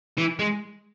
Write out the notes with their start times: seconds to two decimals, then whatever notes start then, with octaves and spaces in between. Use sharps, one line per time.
0.18 E3
0.39 G#3